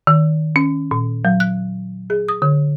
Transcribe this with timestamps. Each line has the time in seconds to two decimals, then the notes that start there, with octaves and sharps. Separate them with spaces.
0.07 D#3
0.56 C#4
0.91 A#2
1.25 F#3
1.40 F#6
2.10 G#4
2.28 D#6
2.42 D3